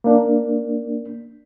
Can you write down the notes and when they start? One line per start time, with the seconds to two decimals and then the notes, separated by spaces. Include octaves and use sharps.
0.04 A#3 D4